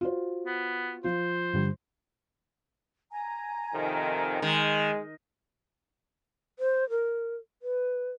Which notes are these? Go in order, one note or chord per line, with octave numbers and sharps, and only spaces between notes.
F4 F#4 C5
B3
F3 F4 C5
G2 D3 G3
G#5 A#5
F2 C3 D#3
D#3 G#3
C5
A#4
B4